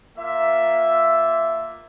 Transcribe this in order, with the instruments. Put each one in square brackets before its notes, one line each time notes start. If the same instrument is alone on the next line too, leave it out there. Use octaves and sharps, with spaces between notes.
[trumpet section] A#3 F4 E5